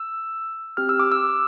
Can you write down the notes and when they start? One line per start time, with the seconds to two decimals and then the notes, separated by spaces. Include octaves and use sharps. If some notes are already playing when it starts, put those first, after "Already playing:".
Already playing: E6
0.77 C4 G4 F6
0.89 E6
0.99 D6
1.12 E6